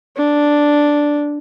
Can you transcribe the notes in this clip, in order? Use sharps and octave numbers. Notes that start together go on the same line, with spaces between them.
D4